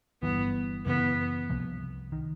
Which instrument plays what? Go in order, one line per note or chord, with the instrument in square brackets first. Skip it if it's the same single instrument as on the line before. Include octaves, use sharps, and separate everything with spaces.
[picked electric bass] G1 G2 E3 [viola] B3
[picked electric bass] F#2 C#3 E3 [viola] B3
[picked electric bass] C2 C3 F3 A#3
D#3